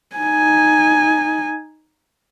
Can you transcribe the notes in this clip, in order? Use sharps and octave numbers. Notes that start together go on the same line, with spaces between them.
D#4 G#5